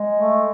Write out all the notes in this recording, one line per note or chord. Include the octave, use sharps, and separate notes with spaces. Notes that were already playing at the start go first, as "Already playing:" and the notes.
Already playing: G#3
A3